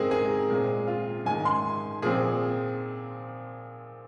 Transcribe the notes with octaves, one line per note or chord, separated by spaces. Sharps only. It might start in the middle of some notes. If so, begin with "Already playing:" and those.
Already playing: G#2 G#3 C4 G#4 A#4
G#4
A#2 G#3 C4
F4
G#2 D#3 G#3 G#5
C6
A#2 F3 C4 G#4